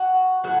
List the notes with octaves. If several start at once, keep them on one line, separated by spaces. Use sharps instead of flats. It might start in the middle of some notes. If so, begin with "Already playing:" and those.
Already playing: F#4
A2 F#3 F#4